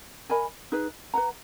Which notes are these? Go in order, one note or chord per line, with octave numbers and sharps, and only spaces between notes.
A#4 D#5 G#5 B5
D#4 G#4 B4
B4 F#5 A#5